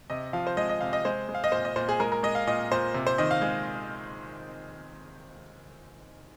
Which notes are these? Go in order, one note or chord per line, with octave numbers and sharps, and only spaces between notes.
C3 D#5
F3 F5
C5
G#3 D#5
D#5
C3 F5
D#5
G#3 C5
G#3
F5
D#5
A#2 C5
D#5
A#2 C5
G#4
G#3 A#4
A#4
G#3 D#5
F5
A#2 D#5
A#2 C5
C3
C5
D#3 D#5
F5
G#3